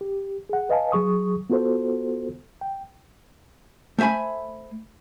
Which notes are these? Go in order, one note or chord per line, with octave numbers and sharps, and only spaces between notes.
G4
G#4 F#5
B4 D#5 F5 G#5 A5
F#3 G#4 C#6 D#6
B3 F4 F#4 A4 C5
G5
A3 C5 E5 G#5 B5